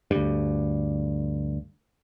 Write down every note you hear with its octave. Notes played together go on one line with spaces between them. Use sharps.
D2 G2